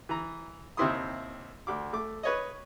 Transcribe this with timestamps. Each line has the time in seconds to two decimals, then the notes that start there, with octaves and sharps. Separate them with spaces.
0.09 E3 A#5
0.77 D#2 C3 C4 E4 C6 D#6
1.67 D2 D6
1.93 A3 D6
2.23 B4 C#5 D#5